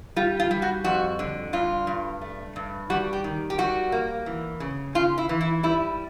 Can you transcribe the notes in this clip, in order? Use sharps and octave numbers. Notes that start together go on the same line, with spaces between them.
G3 F4
F4
G3
F#4
F2 F#4
D3
G2 F4
G2
A3
G2
G3 F#4
G4
D#3
G4
G3 F#4
A#3
E3
C#3
C#3 F4
E4
E3
E4
G3 E4